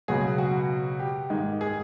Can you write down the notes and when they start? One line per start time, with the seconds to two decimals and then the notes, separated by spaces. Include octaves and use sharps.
0.08 C#2 B2 F#3 G#4
0.38 F#4
0.99 G4
1.30 G#2 D#3 G#3
1.61 G#4